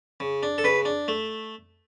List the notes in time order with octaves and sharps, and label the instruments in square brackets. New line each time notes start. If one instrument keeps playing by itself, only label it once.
[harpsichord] C#3
D4
A4
C#3 B4
D4
A3